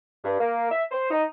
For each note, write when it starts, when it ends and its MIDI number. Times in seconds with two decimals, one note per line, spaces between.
0.25 0.37 43
0.40 0.71 58
0.71 0.84 76
0.92 1.07 72
1.11 1.24 63